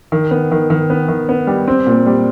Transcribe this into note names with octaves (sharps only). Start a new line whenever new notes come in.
D#3
B3
D#3
D#3
B3
D#3
B3
G3
C4
A#2
G3